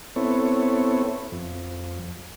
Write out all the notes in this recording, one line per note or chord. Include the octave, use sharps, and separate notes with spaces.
B3 C4 E4 A4 C#5
F2